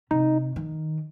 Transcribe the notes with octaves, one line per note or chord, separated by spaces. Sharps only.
C3 D#4
D#3